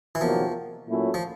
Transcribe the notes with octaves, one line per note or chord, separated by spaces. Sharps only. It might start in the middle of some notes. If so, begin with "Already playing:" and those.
E3
E2 C3 D#3 F3 F#3 A#3
A#2 F#3 A3 C#4 E4
F3